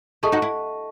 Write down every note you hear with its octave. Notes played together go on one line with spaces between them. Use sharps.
E4 G#4 A4 D#5 A5 C#6
D#4 F#4
E4